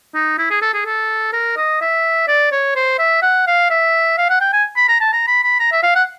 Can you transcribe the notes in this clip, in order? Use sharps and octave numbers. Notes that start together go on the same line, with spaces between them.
D#4
E4
G#4
A4
G#4
A4
A#4
D#5
E5
D5
C#5
C5
E5
F#5
F5
E5
F5
F#5
G5
G#5
B5
A#5
A5
A#5
B5
B5
A#5
E5
F5
F#5